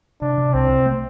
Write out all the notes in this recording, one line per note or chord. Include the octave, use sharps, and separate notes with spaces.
C3 D4
C3
C2 C4
C3
A3